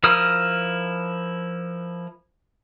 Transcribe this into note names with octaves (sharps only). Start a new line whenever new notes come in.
F3 E4 A#4 D#6 F6